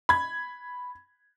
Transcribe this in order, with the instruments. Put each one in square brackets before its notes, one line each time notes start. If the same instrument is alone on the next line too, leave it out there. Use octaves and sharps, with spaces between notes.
[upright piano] B5 G#6